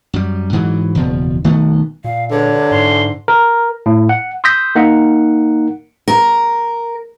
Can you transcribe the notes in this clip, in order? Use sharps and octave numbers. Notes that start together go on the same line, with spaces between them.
F#2 G3
G#2 E3 F#3
F#1 E2 B2 F3
B1 D#3 A3 B3
A#2 F5
C#2 D3 G#3 C#5
G2 C3
G#2 E3 C#4 C6
A#4
A2
F#5
C6 D#6 E6 G6 A#6 B6
A#3 D#4 A#4 F#5
A#4